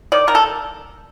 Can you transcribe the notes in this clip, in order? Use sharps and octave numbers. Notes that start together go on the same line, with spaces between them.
D#3 D5
D#3 A#4
A4